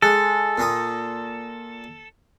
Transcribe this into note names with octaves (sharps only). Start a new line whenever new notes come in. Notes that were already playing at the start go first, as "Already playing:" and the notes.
G#3 A4
A#2 A#3 D#6